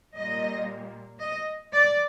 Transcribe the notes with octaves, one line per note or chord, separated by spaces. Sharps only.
A#2 G3 A#3 D#5
D#5
D5